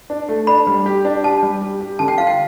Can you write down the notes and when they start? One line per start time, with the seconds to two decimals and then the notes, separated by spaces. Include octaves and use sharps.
0.10 D4
0.29 A3
0.47 D4 B5
0.67 G3
0.86 G4
1.05 D4
1.24 G4 A5
1.43 G3
1.61 G4
1.81 G4
1.99 D3 A5
2.08 G5
2.18 F4 F5
2.27 G5